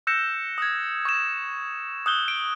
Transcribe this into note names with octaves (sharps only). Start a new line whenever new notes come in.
E6 F#6 G6 A#6 C#7 E7
D#6 G#6
C#6 G6 E7
D#6 E6 F#6 G6 G7
D7